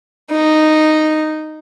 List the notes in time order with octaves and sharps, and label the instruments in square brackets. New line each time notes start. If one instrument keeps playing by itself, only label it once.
[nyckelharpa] D#4